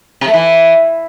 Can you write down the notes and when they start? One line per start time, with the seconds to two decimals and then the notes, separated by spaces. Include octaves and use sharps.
0.21 C3
0.27 A3
0.34 E3